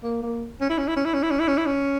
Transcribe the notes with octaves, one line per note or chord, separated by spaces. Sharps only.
A#3
A#3
C#4
E4
C#4
E4
C#4
E4
C#4
E4
C#4
E4
C#4
E4
C#4